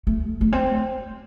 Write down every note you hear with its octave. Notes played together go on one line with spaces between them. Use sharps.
A3
A3
C4